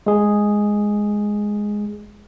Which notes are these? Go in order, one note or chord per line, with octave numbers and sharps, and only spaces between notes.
G#3 G#4